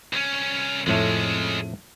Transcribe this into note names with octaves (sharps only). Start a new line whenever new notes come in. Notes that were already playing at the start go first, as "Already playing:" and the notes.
C2 C#4
F2 A2 G#3 A3 C#4